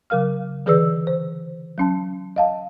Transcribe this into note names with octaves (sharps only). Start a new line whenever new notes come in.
C#3 F#3 A#4 F5 F6
D3 E3 G#4 B4 D5 E6
C5
F#3 C#4 A5
D#5 F5 A5